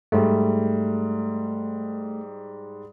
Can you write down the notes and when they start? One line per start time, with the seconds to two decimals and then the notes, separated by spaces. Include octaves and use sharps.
0.12 G#2 G3 A3